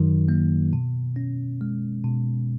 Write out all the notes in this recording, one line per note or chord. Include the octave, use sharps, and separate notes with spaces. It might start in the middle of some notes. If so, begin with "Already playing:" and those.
Already playing: F#2 D#3 F#3
A#3
B2
C#4
G#3
B2